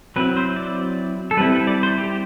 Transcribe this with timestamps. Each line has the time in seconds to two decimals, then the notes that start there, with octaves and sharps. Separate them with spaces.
0.16 F#3 C4 E4 B4
0.37 C5
0.56 D5
1.31 A4
1.37 G3 B4
1.40 C4 E4
1.52 B4
1.67 D5
1.83 C5
1.98 G4